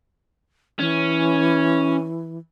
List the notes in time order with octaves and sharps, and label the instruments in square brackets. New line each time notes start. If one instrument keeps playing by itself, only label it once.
[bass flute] E3 [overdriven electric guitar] C#4